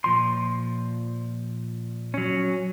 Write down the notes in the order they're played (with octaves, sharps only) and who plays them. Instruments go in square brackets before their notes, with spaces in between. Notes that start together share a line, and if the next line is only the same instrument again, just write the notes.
[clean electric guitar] A#2 F3 C6
[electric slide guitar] F#3 C#4